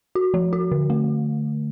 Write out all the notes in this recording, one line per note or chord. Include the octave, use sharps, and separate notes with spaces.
F#4
F3
F#4
D3
A3